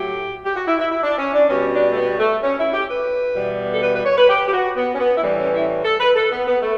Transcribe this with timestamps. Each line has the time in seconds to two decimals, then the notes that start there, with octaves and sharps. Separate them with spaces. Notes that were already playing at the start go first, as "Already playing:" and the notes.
Already playing: A2 F#3 A3 G4
0.45 G4
0.56 F#4
0.67 E4
0.79 E4
0.91 E4
1.03 D4
1.18 C#4
1.34 D4
1.49 B2 G3 C#4
1.73 D4
1.92 A3
1.96 B3
2.19 A3
2.43 C#4
2.58 E4
2.73 G4
2.89 B4
3.35 E2 B2 G3
3.72 A4
3.82 B4
3.95 B4
4.05 C#5
4.17 B4
4.29 G4
4.48 G4
4.53 F#4
4.76 B3
4.94 C#4
4.99 B3
5.17 E4
5.22 A2 E3 G3 D4
5.38 C#4
5.53 E4
5.84 A4
6.00 B4
6.15 A4
6.31 B3
6.47 B3
6.62 A3